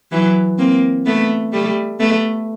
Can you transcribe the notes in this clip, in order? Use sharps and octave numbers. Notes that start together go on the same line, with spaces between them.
E3 F#3
A#3 C4
A3 B3
G3 A3
A3 B3